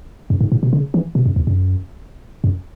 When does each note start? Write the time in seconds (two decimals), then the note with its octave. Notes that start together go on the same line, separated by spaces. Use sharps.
0.30 F#2
0.41 G#2
0.52 A2
0.63 B2
0.73 C#3
0.94 E3
1.15 B2
1.26 F#2
1.36 E2
1.47 F#2
2.44 F#2